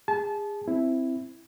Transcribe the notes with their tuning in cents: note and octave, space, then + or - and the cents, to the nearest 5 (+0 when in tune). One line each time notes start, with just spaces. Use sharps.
G#4 -25 A5 -30
C4 +0 E4 +0